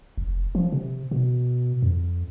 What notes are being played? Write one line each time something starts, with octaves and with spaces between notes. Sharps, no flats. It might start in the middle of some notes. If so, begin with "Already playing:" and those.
F1
F3
C3
B2
F2